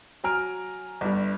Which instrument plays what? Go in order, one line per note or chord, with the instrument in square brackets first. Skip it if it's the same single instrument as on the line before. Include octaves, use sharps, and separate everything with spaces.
[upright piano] F#3 G#5 A#5 F6 D7
G1 G2